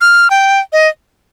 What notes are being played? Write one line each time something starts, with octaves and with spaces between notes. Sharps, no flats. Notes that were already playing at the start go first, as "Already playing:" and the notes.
F6
G5
D#5